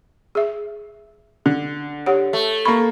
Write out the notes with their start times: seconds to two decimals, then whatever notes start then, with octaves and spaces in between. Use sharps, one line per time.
0.35 G#4 E5
1.46 D3
2.06 G4 C#5 F#5
2.33 A3
2.65 A#3 B5 C#6